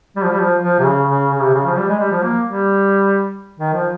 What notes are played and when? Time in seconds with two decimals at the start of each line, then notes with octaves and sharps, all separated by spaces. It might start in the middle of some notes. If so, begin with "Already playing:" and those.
0.16 G3
0.24 F3
0.32 G3
0.40 F3
0.62 F3
0.79 C3
0.85 C#3
1.09 C#3
1.32 C#3
1.42 C3
1.54 C#3
1.66 F3
1.77 G3
1.88 G#3
1.99 G3
2.12 F3
2.23 A#3
2.45 G3
3.60 D#3
3.74 F3